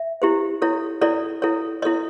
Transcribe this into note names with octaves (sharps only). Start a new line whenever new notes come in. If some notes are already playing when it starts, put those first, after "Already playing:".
Already playing: E5
E4 G4 C5
E4 A4 C#5
E4 A4 C#5 D5
E4 A4 C#5
E4 A4 C#5 D#5